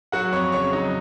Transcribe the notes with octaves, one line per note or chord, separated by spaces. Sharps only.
F#3 F#4 F#5
F2 C#5 C#6
C#3 C#5 C#6
F#3 D#4 D#5